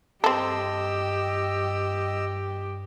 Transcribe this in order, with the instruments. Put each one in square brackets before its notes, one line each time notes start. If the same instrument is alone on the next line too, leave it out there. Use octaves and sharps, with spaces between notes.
[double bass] G2 [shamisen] C4 A4 [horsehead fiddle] G4 [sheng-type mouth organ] D#5 E6